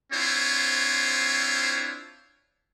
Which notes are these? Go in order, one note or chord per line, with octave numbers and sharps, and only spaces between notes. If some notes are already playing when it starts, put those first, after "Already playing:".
C4 D4 E4 F4 C5 C#5